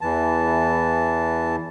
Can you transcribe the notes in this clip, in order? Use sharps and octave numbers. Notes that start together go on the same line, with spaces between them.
E2 E3 A5